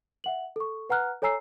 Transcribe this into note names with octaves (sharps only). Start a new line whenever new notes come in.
E5 F#5 F#7
A4 C#6
B4 F#5 A#5 F6 F#6
A4 C#5 G#5 A#5 E6 C7